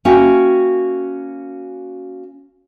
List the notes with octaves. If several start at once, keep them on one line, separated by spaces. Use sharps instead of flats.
A#3 C#4 F#4 E5 G5